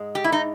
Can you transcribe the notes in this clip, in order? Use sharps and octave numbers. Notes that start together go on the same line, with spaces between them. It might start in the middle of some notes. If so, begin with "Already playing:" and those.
Already playing: G#2 G#3
G4
E4
D#4